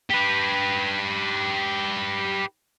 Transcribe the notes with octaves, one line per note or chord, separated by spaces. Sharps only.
G4 B4